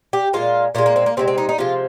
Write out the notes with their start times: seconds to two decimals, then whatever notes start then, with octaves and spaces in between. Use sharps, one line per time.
0.13 G4
0.33 A#2 G#3 F4
0.75 A#2 F4
0.78 G#3
0.86 A#3
0.96 C4
1.06 A#3
1.17 C3 F3 G#3 C4
1.28 C4
1.38 D#4
1.49 D#4
1.58 C3 F3 G#3 F4